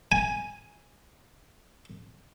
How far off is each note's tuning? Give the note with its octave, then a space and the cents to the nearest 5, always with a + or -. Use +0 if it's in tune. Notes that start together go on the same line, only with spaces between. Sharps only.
G#5 +0